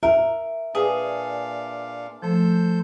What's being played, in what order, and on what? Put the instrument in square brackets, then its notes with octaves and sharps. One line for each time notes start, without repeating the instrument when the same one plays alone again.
[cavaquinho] A#4 [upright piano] E5
[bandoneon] A#2 D4 F5 [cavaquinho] G#4 [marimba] B4
[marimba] F3 A3 [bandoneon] A4 C5 G6